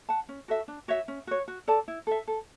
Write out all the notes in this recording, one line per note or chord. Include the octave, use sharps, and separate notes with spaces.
F#5 A5
C#4
F#4 A4 E5
D4
F#4 C#5 E5
C#4
F#4 C#5
F#4
A4 D5 A5
E4
A4 E5
A4